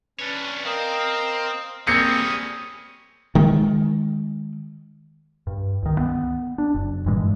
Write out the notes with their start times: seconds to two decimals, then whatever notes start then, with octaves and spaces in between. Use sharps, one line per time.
0.19 C#4 D4 B4 C#5
0.65 C4 A#4 D#5 F5
1.87 G3 A#3 C4 C#4 G#4 C#6 D#6 C#7
3.35 D#3 G#3
5.47 G2
5.83 C#2 D#3
5.99 B3
6.58 D4
6.75 F#1
7.06 G2 A#2 E3 G#3